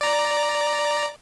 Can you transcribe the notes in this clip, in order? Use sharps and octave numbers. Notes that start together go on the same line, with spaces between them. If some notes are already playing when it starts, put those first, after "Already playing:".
D5 A#5